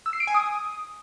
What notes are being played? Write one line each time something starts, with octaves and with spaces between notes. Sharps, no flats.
E6
C7
D7
G#5
D#6